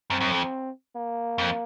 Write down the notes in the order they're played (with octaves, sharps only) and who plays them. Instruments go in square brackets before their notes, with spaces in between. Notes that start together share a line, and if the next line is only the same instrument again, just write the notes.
[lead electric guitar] F#2 [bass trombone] C4
[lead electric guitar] F#2
F2
[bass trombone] A#3
[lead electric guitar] F2